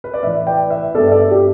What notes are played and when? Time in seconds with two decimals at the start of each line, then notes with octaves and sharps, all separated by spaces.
0.04 B4
0.14 D5
0.23 A2 E3 A3 B4 E5
0.47 D5 G5
0.70 B4 E5
0.94 G2 G3 B3 A4 D5
1.07 E5
1.11 A4 D5
1.31 G4